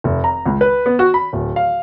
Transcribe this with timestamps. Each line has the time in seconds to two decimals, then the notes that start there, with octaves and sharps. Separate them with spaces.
0.04 F1
0.24 A#5
0.46 C#2
0.61 B4
0.86 B3
0.99 F#4
1.14 B5
1.33 D1
1.56 F5